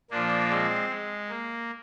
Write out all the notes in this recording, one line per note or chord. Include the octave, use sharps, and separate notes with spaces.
A#2 F3 A#3 D4
G#3 C4
G#3
A#3